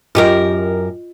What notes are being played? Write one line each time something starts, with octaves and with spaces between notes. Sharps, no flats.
F#2 F4 G4 A#4 D#5